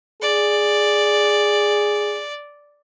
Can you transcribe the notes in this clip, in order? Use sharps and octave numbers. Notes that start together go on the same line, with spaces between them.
G#4 D5